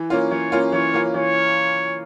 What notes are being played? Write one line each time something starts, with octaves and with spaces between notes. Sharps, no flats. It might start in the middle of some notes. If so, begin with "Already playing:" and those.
Already playing: E3
A#3 C#4 F4
E3 C#5
A#3 C#4 F4
E3 C#5
A#3 C#4 F4
E3 C#5